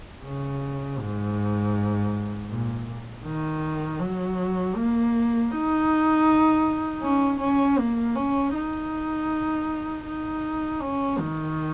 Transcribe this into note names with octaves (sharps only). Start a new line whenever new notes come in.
C#3
G#2
A#2
D#3
F#3
A#3
D#4
C#4
C#4
A#3
C#4
D#4
D#4
C#4
D#3